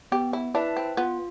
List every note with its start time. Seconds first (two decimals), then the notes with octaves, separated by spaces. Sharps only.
0.12 B3 G4
0.33 E4
0.54 D4 E4 B4 E5 A5
0.77 C4
0.97 B3 F4